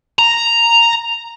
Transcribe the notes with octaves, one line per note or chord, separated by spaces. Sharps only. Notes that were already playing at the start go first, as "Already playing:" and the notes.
A#5